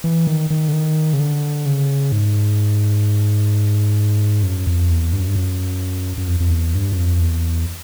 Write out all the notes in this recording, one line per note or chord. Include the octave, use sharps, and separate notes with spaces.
E3
D#3
D#3
D3
D#3
C#3
D3
C#3
G#2
F#2
F2
E2
G2
F#2
G2
F#2
F#2
F2
F2
E2
G2
F#2
F2
E2